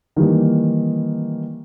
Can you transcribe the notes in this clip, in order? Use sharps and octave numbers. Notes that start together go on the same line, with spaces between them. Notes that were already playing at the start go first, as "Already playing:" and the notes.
D#3 E3 G3 A#3